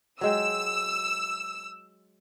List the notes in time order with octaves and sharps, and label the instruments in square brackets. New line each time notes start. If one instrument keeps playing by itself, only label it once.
[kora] F#3 G#3 G5 [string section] E6